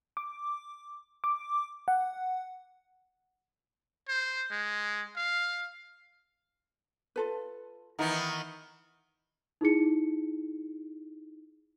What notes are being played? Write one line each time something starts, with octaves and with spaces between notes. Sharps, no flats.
D6
D6
F#5
C5
G#3
F5
F4 A4 B4
D#3 E3 B3 D#4 F#5 A#5
D#4 E4 G#4 C#7